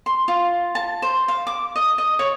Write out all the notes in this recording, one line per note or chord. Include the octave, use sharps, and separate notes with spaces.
C6
F4
A5
C5
F5
D6
D#5
D#5
C#5